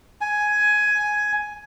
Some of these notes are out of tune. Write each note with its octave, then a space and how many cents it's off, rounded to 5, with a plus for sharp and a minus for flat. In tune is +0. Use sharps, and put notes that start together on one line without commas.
G#5 +10